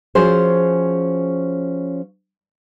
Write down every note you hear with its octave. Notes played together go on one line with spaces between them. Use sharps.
F3 C#4 F#4 G#4 C5